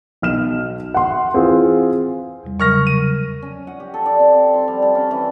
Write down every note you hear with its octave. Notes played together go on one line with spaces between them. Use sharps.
B1 F6 E7
F#5 C6
E3 C4 F4 G#4
E2 C3 G3
C#3 F#3 A#4 C#6 F6 A#6
D#7
C#4
F#5
G4
A4
D5
C4
C6
G3
A5
C#4
E3